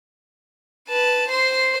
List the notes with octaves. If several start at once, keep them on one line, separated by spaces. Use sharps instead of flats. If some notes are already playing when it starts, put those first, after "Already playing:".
B4 A5
C5 C6